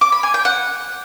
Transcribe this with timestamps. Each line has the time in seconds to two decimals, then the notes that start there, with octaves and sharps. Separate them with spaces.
0.01 D6
0.12 B5
0.23 G#5
0.34 G5
0.45 F#5